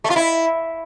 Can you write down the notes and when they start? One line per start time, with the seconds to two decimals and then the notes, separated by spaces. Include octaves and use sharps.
0.04 A3
0.10 F4
0.16 E4